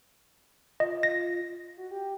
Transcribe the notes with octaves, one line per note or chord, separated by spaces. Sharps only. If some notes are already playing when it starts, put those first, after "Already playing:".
F4 D#5
A#6
F#4
G4